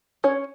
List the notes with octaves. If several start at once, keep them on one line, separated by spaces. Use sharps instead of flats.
C#4 C#5